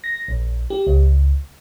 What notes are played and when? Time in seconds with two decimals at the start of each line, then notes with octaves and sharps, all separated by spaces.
0.04 A#6
0.28 A#1
0.70 G4
0.87 C#2